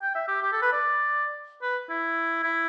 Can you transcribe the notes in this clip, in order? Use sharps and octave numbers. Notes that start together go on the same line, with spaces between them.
G5
E5
G4
G4
A4
B4
D5
B4
E4
E4